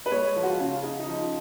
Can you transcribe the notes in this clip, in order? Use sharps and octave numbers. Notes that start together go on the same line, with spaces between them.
B4
G#3 C#5
F3
F#4
F4
C#3
C#3 D#4
D#4
F3